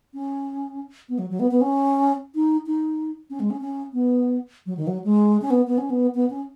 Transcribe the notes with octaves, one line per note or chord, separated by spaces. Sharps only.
C#4
B3
F#3
F#3
B3
B3
C#4
D#4
D#4
C#4
G#3
C#4
C#4
B3
F#3
D#3
F#3
G#3
C#4
B3
B3
C#4
B3
B3
C#4